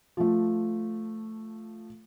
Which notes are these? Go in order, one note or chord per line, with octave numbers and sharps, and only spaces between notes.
F3 A3